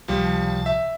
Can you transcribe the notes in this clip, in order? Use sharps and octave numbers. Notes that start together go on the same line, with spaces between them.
C#2 C3 F3 G3 A5
E5